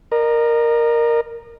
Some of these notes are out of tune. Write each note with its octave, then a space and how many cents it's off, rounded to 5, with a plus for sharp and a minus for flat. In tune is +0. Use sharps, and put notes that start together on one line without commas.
A#4 +0 D#5 -45